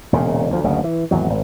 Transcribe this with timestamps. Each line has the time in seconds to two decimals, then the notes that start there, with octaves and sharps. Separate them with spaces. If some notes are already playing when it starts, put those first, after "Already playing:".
0.13 E1 A#2 C#3
0.50 D2 F3
0.64 F#1 D2 C#3
0.84 E3
1.11 G#1 E2 F#3
1.30 G#1